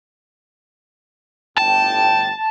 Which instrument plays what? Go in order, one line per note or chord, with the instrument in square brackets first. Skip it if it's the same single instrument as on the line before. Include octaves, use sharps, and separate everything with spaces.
[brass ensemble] G1 A2 G5 [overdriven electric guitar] A5